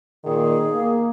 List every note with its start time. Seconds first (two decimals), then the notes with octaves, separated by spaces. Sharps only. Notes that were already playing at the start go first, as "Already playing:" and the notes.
0.24 A#2 D#3 D#4 G#4
0.72 A#3